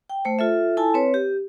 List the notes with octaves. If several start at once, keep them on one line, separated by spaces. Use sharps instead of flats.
G5
A3 C5
F4 A4 E5
E4 A4 G#5 A5
C4 B4 C#5
G4